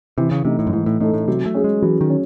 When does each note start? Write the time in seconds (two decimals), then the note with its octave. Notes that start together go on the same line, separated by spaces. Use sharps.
0.18 C3 E3
0.31 C#3
0.45 C3 A3 D#4 A4
0.59 A2
0.67 F#2
0.73 G#2 E3
0.86 A2
1.00 A2 A3 D#4 A4
1.14 A2
1.28 C3 F#3
1.46 A3
1.54 C#4 G#4
1.64 G#3
1.82 E3 F#3
2.01 D#3
2.10 C#4